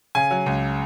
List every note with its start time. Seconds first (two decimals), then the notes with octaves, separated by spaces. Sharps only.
0.15 C#3 G#5
0.31 F#3
0.46 C#2